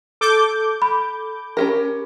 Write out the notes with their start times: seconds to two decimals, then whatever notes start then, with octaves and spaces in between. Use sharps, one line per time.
0.21 A4 D6 G6
0.82 B5
1.57 C#4 G4 A#4